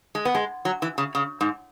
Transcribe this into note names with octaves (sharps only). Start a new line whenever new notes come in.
G#3
B3
G#3
F#3
E3
C#3
C#3
G#2